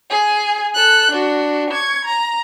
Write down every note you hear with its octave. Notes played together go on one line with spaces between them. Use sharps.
G#4 G#5
A4 F#6
D4 F#4
C#6 G#6
A#5